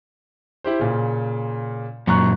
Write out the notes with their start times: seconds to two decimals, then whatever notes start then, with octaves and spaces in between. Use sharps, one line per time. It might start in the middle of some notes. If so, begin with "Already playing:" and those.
0.64 E4 G4 C5
0.79 A#2 C#3
2.07 F#2 A#2 F#3 A#5 C#6 F#6